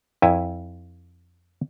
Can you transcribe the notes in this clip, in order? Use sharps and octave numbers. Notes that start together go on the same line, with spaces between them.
F2 E4 G#5